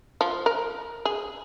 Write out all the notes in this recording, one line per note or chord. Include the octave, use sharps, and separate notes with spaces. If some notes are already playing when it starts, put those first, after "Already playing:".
F3
A#4
G#4